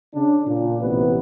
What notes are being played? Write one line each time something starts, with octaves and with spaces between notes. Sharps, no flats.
C#3 D4
A#2
A1 C3 B3 B4